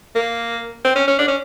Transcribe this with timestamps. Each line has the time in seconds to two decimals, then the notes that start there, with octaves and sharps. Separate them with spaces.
0.15 A#3
0.85 C4
0.96 C#4
1.08 C#4
1.18 D4
1.28 C#4